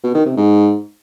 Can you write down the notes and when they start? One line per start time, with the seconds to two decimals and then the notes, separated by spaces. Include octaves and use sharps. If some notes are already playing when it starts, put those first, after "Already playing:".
0.04 B2
0.15 D#3
0.26 C3
0.37 G#2